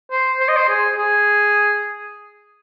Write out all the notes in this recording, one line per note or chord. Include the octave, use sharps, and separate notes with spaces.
C5
C5
D#5
C5
G#4
G#4